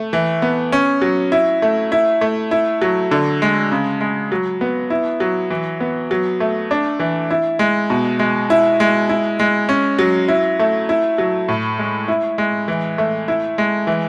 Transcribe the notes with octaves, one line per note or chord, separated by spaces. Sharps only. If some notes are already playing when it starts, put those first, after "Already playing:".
Already playing: A3
E3
B3
C#4
F#3
E4
A3
E4
A3
E4
F#3
D3
G#3
C#3
G#3
F#3
B3
E4
F#3
E3
B3
F#3
A3
D4
E3
E4
G#3
B2
G#3
E4
G#3
E4
G#3
C#4
F#3
E4
A3
E4
F#3
A2
G#3
E4
G#3
E3
A3
E4
G#3
E3